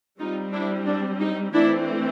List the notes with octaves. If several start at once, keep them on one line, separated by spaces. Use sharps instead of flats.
G3 C4 D#4 F4
D4 E4
D4
D#4
E3 A3 C4 D4 E4